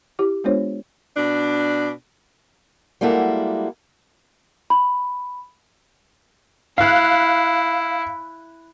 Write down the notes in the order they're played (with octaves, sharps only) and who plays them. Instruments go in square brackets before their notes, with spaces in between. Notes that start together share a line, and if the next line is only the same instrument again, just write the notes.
[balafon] E4 G4 D6
G#3 B3 D4 F4 C5 C#5
[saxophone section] B2 D4
[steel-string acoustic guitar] G3 G#3 A#3 E4 F#4 A4
[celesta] B5
[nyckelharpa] E4 [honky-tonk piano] F5 F#6